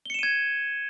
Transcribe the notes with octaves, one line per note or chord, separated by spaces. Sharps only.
G#6 C#7 D#7 E7 G7